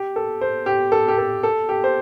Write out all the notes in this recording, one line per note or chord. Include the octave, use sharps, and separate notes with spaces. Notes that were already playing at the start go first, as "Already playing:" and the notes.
Already playing: G4
A4
C5
G4
A4
G4
A4
A4
G4
C5